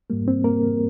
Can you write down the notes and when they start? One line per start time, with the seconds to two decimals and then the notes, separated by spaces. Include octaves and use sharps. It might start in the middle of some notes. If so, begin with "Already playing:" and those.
0.10 G#2 G3 A#3
0.28 C4
0.44 A#3 A#4